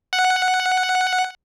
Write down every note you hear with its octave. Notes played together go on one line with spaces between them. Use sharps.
F#5